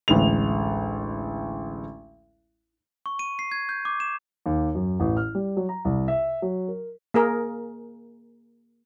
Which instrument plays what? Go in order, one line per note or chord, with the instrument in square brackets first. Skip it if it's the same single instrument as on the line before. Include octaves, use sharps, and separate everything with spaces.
[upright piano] A1 D2 G#3 F7
[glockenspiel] C#6
D#7
C7
G#6
G6
D6
E7
[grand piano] D#2
F#2
A1
F6
G3
F#3
A#5
C2
E5
F#3
A#4
[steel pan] A#3 G#4 A#4